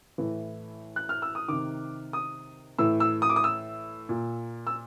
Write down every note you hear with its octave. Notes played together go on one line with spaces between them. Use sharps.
A2 E3
F#6
F6
E6
D#6
C3 D#3 D6
D#6
A2 E3 E6
E6
D#6
D6
D#6
E6
A#2
E6